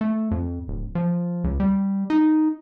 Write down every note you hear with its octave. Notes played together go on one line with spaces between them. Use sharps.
A3
F2
D1
F3
C#2
G3
D#4